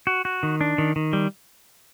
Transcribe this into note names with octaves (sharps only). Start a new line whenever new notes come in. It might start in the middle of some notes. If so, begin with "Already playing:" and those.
F#4
F#4
D#3
D4
D#3
D#3
G3